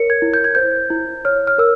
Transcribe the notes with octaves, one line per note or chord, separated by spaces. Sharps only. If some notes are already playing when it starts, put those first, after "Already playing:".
Already playing: A#4 C#5 C#7
G#6
E4
G6
G#6
C5 G6
E4
C#5 F6
F6
A#4 E6